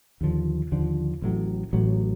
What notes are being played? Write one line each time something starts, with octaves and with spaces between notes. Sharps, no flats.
D#2 D3 F3
D#2 D3 F3
A1 A2 F#3
A1 A2 F#3